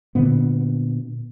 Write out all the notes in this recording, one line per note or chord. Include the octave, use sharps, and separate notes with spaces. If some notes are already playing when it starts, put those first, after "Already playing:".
A#2 D3 B3